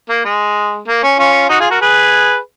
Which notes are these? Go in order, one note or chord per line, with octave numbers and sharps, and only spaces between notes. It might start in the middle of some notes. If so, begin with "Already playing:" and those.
A#3
G#3
A#3
C#4
C#4 F4
D#4 F#4
F4 G#4
F#4 A#4
G#4 B4